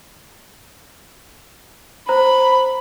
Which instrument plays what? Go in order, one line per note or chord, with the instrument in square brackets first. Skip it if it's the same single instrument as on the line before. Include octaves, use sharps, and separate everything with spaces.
[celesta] C5 A#5 [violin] B5